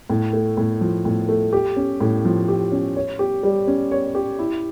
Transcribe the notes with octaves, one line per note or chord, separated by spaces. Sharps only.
A2
A3
A2
F3
A2
A3
G4
C#4
A2
F3
G4
C#4
C#5
G4
G3
C#4
C#5
G4
E4